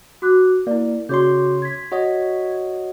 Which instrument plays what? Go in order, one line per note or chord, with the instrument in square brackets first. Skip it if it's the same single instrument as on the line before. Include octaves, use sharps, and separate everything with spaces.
[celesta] F#4 D6 F#6
[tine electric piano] A#3 [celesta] E4 D5
[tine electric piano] C#3 C#5 C6 [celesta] F#4 D6 G6
[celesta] G#6 B6
[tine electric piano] F#4 C#5 D#5